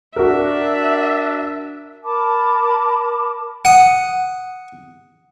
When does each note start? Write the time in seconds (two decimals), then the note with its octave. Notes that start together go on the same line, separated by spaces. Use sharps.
0.16 D4 F#4 A#4 E5
2.03 A#4 A5 B5 D6
3.65 F#5 D#6